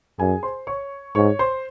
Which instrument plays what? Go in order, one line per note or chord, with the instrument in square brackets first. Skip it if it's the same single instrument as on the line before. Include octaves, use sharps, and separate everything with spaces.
[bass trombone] F#2 [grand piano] G#4 G#5
[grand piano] C5 C6
C#5 C#6
[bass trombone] G#2 [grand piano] C#5 C#6
[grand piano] C5 C6